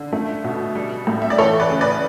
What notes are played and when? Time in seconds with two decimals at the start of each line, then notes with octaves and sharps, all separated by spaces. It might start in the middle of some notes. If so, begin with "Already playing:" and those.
Already playing: D3
0.13 A3
0.44 B2
0.75 G3
1.07 A2
1.22 E5
1.30 D5
1.38 E3 A4 C#5
1.60 B4 D5
1.70 C#3
1.81 B4 D5